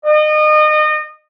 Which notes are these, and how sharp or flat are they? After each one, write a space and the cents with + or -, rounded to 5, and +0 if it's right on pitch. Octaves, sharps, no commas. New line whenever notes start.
D#5 -30